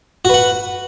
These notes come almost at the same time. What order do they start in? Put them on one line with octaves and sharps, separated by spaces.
F#4 B4 F#5